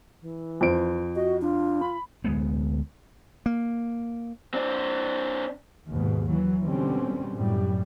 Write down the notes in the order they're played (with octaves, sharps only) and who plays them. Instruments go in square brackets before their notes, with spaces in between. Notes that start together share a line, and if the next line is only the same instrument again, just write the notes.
[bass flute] E3
[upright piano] F2 C5 D7
[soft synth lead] F#4 [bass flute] D#5
[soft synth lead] D4 [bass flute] F4
[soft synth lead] B5
[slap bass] D2 G#3 B3
A#3
[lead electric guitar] C4 D4
[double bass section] D#2 G#2 B2
E3 F#3
B2 D3 G3 C4 C#4
F#2 A2 F#3 G3